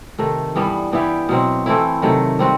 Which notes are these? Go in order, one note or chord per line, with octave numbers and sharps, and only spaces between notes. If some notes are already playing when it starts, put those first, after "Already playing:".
C3 D#3 A3
G2 E3 G3 B3
E3 B3 E4 G4
B2 F#3 C4
E3 A3 C4 E4
C3 D#3 F#3 A3
G3 C4 F#4